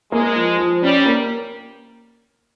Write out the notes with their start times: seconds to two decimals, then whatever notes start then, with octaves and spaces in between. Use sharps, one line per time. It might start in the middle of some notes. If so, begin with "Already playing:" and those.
0.12 G#3 A#3
0.36 F3
0.58 F3
0.82 G3 C#4
1.06 A#3